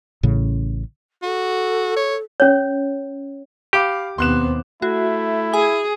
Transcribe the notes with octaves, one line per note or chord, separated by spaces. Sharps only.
A1 A2 C#3
F#4 A4
C#5
C#4 C#5
G4 F5 B5 D6
D#2 B2 B3 C4 C6 F#6 E7
A3 E4 F#4
G#4 G#5